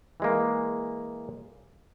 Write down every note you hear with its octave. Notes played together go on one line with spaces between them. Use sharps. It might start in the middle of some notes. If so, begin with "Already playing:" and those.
E3 G#3 A#3